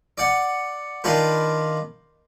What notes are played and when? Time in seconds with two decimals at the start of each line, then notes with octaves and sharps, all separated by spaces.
0.18 D5 F#5
1.04 D#3 D4 F4 B4